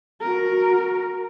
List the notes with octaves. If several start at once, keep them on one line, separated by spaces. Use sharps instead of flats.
F#4 A#4